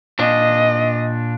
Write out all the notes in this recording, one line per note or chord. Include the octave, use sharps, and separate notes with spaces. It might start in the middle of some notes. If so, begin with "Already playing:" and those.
A#2 D4 D#5